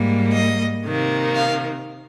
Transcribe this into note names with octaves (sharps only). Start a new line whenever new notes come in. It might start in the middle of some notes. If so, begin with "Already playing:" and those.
Already playing: G#2 G3 A#3
D#5
C3 D#3 A#3
F5